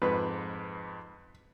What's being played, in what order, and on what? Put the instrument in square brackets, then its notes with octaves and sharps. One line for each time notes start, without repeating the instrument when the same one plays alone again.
[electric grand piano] F2 G#2 [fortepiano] B4